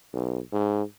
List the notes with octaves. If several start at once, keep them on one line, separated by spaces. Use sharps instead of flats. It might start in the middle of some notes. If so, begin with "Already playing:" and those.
B1
G#2